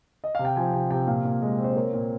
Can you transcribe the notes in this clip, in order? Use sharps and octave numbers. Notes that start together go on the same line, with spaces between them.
D#5
C3 F5
G5
F3 G#5
C3 G5
C3 G5
A#2 F5
A#2
G#3
C4
C5
A#3 C#5
A#2